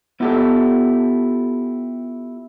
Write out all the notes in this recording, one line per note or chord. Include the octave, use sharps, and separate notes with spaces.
B3 E4 F4 G4 A4